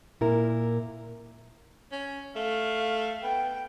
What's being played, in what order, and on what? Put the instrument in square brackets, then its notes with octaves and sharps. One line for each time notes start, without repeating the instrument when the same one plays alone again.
[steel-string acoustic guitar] A#2 E4 A#4
[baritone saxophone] C#4
[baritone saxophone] A3 [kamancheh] F5
[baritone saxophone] B3 [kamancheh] G5